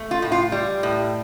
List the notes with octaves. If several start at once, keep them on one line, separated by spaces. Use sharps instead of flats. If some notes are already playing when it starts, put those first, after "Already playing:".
Already playing: A3
F4
A2
F4
G3
A2